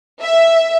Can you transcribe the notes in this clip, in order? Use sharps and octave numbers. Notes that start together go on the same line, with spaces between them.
E5